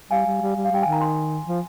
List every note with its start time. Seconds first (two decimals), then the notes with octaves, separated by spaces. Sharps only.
0.11 G3 F5 G#5
0.26 G3
0.41 G3
0.56 G3
0.65 F5
0.71 G3 G5
0.82 D#3 G#5
0.92 A#5
1.01 G#5 C6
1.47 F3